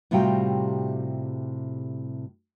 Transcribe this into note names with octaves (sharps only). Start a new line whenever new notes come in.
A2 C3 G3 F4 F#4 G5